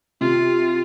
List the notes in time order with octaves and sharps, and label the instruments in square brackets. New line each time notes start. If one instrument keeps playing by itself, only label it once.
[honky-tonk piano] C3 [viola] F4